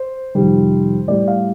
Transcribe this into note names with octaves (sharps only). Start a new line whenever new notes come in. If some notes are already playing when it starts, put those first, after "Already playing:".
Already playing: C5
F2 C3 D#3 G3
A2 G3 D5
F5